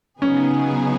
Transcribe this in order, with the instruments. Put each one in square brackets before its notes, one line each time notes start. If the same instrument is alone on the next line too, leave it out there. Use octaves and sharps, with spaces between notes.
[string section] C#3 F#3 B3 D#4 G#4 [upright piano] C#4